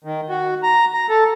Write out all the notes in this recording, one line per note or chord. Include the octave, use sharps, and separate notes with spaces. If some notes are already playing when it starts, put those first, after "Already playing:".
D#3
F#4
A#5
A#5
A4